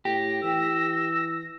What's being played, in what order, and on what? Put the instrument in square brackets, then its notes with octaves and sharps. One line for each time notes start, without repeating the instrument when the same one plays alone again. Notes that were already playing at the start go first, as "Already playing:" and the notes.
[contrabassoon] A2 [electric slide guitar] G4 [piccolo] A#6
[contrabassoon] E3 [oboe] E6